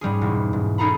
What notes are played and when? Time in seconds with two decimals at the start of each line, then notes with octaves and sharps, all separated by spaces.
0.01 G#2 G3 C#4 G#4
0.21 E1 E4
0.53 G#2
0.78 C#4 D#4 G#4 A4 A#5 B5